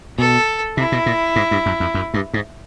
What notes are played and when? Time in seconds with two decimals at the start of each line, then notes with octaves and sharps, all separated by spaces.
0.18 B2 A4
0.77 C3 E4
0.92 B2
1.06 A#2
1.36 G#2
1.51 G2
1.66 F#2
1.80 F2
1.94 F#2
2.14 G2
2.34 G#2